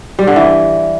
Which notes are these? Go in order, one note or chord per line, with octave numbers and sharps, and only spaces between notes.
G3
D3
E3